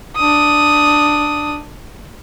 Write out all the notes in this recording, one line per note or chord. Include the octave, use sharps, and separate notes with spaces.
D4 D#6